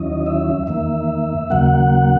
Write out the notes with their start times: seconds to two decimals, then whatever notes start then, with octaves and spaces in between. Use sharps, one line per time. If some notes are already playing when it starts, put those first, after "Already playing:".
Already playing: D#2 D#3 F#3 C#4 E4 D#5
0.26 E5
0.67 E2 D#3 A#3 E5
1.50 D#2 C#3 F#3 A#3 F#5